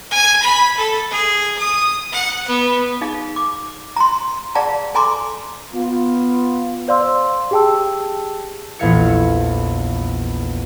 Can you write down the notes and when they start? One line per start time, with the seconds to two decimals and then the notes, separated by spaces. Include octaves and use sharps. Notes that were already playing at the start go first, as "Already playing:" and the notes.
0.11 G#5
0.42 B5
0.77 A4
1.10 G#4
1.58 D#6
2.12 F#5
2.48 B3
3.01 D#4 G#4 F5
3.36 D6
3.96 A#5 C6
4.55 G#4 D5 F5 F#5 A5 A#5
4.95 A4 G#5 A#5 C6 D6
5.73 B3 F4
6.88 C5 D5 F5 C6 E6
7.51 G4 G#4 G5 A5 E6
8.79 A#1 E2 A4 F5 G#6 C#7